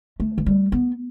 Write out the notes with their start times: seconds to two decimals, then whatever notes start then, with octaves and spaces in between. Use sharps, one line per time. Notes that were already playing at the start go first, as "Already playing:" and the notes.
0.20 A3
0.38 E3
0.46 G3
0.72 B3